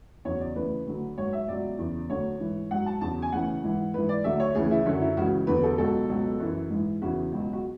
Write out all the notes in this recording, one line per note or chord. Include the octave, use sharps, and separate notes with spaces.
E2 C#3 F#3 C#5
D5
D2 C#3 E3 B4
D2 D3 F#3
G#2 F#3 C#5
E5
C#2 B2 F#3 D5
E2 C#3 E3
D2 D3 F#3 C#5
G#2 E3
G#2 F#3 F#5
A5
E2 C#3 F#3 A5
G#5
D2 C#3 E3 F#5
G#2 E3
G#2 E3 B4
D5
D2 D3 F#3 E5
C#5
D2 C#3 E3 G#4
E4
F#2 D3 F#3 C#4
E4
C#2 C#3 E3 F#4
E2 D3 F#3 B4
A4
C#2 B2 F#3 A4
C#2 B2 F#3
F#2 E3
G#2 E3
E2 C#3 E3 F#4
C#2 B2 F#3
F#4